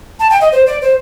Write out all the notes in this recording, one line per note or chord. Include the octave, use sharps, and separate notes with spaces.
A5
G5
D#5
C5
D5
C5